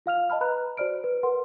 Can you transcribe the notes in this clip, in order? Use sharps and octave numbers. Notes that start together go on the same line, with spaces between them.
F4 F5 F6 F7
D#5 A5 B5 F6
B4 A#5 B5 F#6
F#4 C5 D5 F6 D7
B4
A#4 B4 F#5 C6